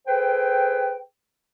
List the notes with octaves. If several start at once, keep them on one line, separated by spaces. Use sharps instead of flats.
G#4 A4 B4 C5 G5